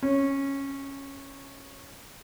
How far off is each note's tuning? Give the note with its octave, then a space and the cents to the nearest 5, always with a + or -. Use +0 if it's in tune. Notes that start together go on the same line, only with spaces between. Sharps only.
C#4 -10